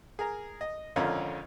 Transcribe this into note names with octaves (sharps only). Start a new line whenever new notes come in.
G#4 A#4 A#5
D#5
G#1 F2 D3 C#4 F4 A#4